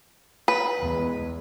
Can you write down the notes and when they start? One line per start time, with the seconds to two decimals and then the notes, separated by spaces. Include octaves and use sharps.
0.48 B4
0.81 E2 G#3